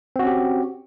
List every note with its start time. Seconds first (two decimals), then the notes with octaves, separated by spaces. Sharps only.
0.16 C4
0.19 F#4
0.23 C#4
0.27 G4